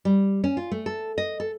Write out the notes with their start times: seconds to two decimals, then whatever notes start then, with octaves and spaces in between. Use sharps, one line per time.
0.05 G3
0.44 C#4
0.57 F4
0.71 A3
0.86 A4
1.18 D#5
1.40 A4